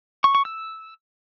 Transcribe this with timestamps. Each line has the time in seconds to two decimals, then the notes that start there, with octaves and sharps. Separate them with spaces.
0.24 C#6
0.35 C#6
0.45 E6